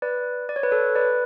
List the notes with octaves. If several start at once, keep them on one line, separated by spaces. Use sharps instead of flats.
B4 D5
D5
C#5
B4
A4 C#5
B4 D5